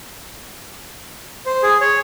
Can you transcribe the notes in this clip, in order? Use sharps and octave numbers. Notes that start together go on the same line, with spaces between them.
C5
G#4
C#5